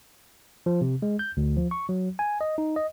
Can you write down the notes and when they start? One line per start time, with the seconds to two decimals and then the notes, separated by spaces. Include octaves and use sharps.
0.66 F3
0.81 C3
1.02 G#3
1.19 G6
1.37 D2
1.57 F3
1.71 C#6
1.89 F#3
2.19 G#5
2.41 D#5
2.58 D#4
2.76 D#5